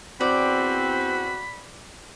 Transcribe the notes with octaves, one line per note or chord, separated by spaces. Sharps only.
E2 C4 F#4 D5 B5